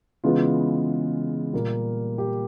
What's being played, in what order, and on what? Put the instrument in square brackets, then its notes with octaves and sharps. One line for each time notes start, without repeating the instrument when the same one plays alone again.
[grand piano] C#3 E3 G#3 B3 F4
A#2 G3 A#3
G4